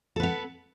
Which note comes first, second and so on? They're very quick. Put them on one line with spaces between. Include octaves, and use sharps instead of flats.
A4 B4 B3